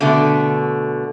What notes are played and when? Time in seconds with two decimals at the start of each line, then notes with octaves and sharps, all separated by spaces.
0.01 B2 D3 A3